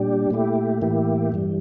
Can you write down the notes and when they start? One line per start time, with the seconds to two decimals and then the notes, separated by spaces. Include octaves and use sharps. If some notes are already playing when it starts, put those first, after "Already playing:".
Already playing: A#2 G3 D4 G4
0.30 A#2 A3 E4 G4
0.82 A2 E3 A#3 E4 G4
1.32 G2 E3 G3